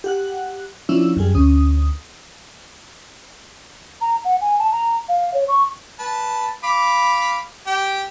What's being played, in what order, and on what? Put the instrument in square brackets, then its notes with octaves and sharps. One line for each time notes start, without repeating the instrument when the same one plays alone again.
[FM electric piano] G4 F#5 F#6
F3 C#4 D4 E4 E6
F#2 G3 G#4
D2 C#4 D#6
[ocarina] A#5
F#5
G#5
A5
A#5
F5
C#5
C#6
[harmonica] B4 A5
F5 B5 D6
G4 G5